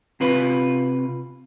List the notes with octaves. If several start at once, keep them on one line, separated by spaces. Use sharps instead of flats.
C3 F4 B4 B5